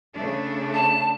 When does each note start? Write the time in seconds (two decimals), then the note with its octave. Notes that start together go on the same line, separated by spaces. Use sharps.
0.15 C#3 A3 D4
0.74 A5